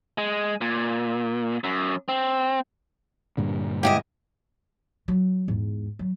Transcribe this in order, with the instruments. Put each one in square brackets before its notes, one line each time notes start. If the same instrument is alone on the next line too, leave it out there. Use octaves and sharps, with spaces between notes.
[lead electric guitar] G#3
A#2
F#2
C4
[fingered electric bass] G2 A#2 D3
[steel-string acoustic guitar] G#2 E4 D#5 [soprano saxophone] G4
[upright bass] F#3
E2 G#2
F#3